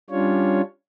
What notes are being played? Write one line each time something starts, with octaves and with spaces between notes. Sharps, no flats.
G3 C#4 D4 F4 C#5